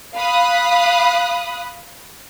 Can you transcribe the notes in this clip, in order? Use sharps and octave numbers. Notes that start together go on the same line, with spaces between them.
F5 B5 D#6 F#6